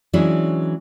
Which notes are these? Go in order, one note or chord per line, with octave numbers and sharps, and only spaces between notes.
E3 F#3 G#3 C#4 D4 E4